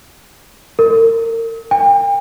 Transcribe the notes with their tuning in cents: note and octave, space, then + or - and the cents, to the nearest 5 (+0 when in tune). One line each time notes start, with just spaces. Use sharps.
A#4 -35
G5 +40